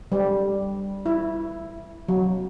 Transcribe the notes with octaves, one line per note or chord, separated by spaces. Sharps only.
G3
E4
F#3